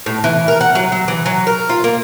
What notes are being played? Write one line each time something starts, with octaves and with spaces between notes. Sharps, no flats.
A2
E3
A#4
F#5
F#3
F#3
E3
F#3
A#4
F4
A#3